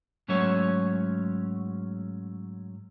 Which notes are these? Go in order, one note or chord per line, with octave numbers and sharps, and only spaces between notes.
G#2 F#3 A3 C#4 C#5